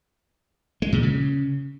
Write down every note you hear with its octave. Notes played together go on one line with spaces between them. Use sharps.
G#3
A#2
C#3